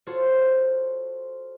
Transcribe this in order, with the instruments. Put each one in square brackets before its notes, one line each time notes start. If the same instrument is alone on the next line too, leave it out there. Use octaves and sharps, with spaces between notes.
[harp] F4 F#4 A4 C5 C#5